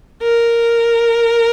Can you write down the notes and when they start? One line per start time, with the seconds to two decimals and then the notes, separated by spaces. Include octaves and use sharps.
0.23 A#4